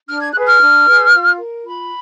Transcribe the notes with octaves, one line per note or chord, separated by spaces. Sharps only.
D4 F6
G#6
G#4 B4 F#6
F6
D4
G#4 B4
F4
A#4
F4 B5